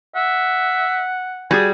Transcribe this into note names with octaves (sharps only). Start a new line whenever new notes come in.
E5 F#5
G3 F#4 G#4 G#5